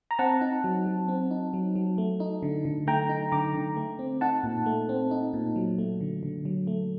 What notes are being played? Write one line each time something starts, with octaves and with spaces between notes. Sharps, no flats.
A#5
C4 F#5 A5
D#4
F#3
F#3
C4
D#4
F#3
F#3
A3
D#4
D3
D3
A3 G5 A#5
D#4
D3 A#5 D6
D3
A3
C4
D#4 F#5 A5
A#2
A3
C4
D#4
A#2
F#3
A3
D3
D3
F#3
A3